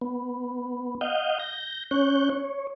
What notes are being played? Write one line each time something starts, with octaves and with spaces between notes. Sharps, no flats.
B3
D#5 F5 F#5 G6
G6 A#6
C#4 C#5 F#6 G6
C#5